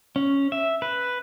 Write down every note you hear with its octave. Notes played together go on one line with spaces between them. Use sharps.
C#4
E5
B4